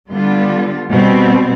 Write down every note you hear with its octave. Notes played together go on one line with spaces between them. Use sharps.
D3 G3 B3 F4
B2 G3 C4